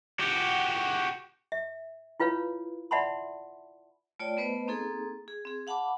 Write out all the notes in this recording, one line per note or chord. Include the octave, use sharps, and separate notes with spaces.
F#4 G4
E5
E4 F4 B4 C#5 F5
D5 E5 F#5 A5 B5 C6
A3 F4 C#5 D5 G5
A3 B3 B4 C5 D#5
A#3 C4 D#4 G#4 A4
G#4
C4 G#4
F5 F#5 A5 B5 D6